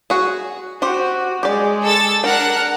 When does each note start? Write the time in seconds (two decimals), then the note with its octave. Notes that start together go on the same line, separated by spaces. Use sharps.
0.10 F#4 G#4
0.82 F#4 G4 C5 G5
1.43 G#3 G4 D5
1.83 A4 E6 A6
2.24 D4 A#4 F#5 G5 F#6